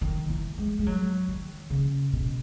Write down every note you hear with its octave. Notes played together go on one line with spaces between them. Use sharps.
D#3
E3
G#3
G#3
F#3
D#3
C#3
B2